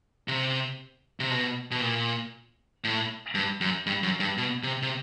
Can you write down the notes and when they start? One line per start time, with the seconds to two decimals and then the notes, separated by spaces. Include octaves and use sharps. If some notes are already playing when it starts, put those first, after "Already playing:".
0.28 C3
1.20 C3
1.31 B2
1.71 B2
1.81 A#2
2.84 A2
3.35 G2
3.61 F#2
3.86 G2
4.03 F#2
4.20 G2
4.37 B2
4.63 C3
4.82 C3